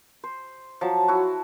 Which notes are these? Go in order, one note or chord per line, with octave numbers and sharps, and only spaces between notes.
C5
F3 F#3 A5
E4 F#4